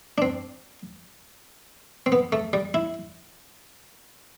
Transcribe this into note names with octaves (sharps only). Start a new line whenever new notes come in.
D4
C4
C4
B3
A3
G3
E4